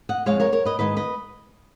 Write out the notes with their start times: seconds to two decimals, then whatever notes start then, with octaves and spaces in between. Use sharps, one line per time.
0.09 D#5 F#5
0.26 F2 D#3 G#3 C#5 F5
0.40 A#4 C#5
0.52 A#4 C#5
0.65 B4 D#5
0.79 G#2 D#3 G#3 B4 D#5
0.96 B4 D#5